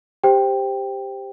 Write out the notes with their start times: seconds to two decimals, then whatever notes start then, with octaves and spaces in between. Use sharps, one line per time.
0.24 G4 C5 G5